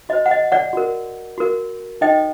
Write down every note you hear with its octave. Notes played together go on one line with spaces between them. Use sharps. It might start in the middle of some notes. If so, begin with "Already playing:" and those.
F#4 C5 D#5
F#5
D#5
D5 F#5
F#4 A#4
F#4 A#4
D#4 A4 C5 D#5 G5